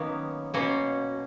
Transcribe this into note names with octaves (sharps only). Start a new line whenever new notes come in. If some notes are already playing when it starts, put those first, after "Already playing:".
Already playing: D#3 F#3 A#3 B3 C#4
B2 A#3 C#4